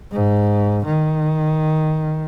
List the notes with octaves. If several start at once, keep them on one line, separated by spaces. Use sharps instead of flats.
G#2
D#3